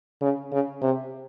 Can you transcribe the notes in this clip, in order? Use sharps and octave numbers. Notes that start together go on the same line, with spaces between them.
C#3
C#3
C3